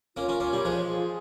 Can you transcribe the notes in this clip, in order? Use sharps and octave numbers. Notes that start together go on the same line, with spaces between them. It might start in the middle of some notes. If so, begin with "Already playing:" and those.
A#3 C#4 F4
A#3 C#4
A#3 C#4 C#5
G3 A#3
F3 G#3 F4
G#4